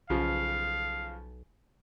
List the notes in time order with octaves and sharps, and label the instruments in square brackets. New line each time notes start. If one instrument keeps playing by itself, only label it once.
[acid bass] B1 [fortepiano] C#3 F3 [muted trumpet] F5